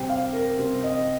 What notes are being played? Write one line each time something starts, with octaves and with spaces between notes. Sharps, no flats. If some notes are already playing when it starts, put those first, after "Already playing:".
Already playing: C3 G3 C4 G5
F5
A#4
C3 G3 C4
D#5